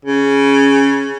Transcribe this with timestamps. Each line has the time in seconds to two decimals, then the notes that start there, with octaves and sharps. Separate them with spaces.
0.05 C#3